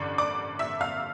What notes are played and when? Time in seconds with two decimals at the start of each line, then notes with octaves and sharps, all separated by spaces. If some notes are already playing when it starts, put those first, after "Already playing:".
Already playing: A1 G2 D3 D5 D6
0.18 D5 D6
0.59 E5 E6
0.81 F5 F6